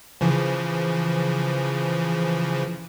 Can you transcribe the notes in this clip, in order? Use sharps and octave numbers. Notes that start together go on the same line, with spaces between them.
C#3 E3 F3